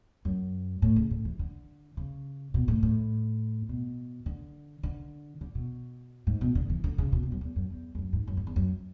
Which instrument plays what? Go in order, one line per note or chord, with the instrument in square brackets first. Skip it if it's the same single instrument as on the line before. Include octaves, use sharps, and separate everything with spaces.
[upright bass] F#2
A2
C#3
A2
E3
D3
C#3
B2
A2
A2
B2
D3
D3
D3
B2
G#2
B2
D3
E3
D3
C#3
B2
B2
F#2
E2
F#2
E2
E2
F#2
G#2
F#2
G#2
E2
F#2